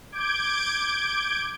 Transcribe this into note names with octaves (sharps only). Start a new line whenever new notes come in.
D6 G6 G#6 D7